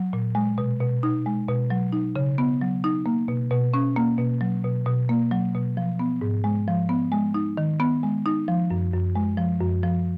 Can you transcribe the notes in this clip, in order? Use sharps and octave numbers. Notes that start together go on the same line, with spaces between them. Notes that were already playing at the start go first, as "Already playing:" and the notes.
Already playing: F#3
A#2
G#3
B2
B2
D#4
G#3
B2
F#3
D#4
C#3
B3
F#3
D#4
A#3
B2
B2
C#4
A#3
B2
F#3
B2
B2
A#3
F#3
B2
F3
B3
G#2
G#3
F3
B3
G#3
D#4
D#3
B3
G#3
D#4
F3
F#2
F#2
G#3
F3
F#2
F3